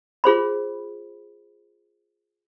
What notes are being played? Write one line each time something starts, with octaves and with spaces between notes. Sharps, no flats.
F4 G#4 C5 B5